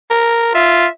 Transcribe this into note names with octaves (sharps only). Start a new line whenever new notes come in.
A#4
F4 E5